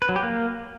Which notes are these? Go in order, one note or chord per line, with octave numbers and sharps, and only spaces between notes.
B4
F#3
G4
A#3